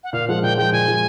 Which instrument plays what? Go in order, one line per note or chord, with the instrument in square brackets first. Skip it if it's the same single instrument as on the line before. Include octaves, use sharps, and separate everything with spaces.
[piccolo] F#5
[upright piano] A#2 [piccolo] F5
[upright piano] F3 G#3 [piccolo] F#5
[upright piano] A#2 [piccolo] G5
[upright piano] F3 G#3 [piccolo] G5
[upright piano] A#2 [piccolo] G#5
[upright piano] F3 G#3